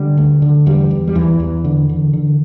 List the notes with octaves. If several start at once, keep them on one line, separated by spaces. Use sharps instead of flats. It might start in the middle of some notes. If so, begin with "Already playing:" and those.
Already playing: D3 G3
D2
D3
E2 G3
E2
G3
E2 E3
E2
D3
D3
D3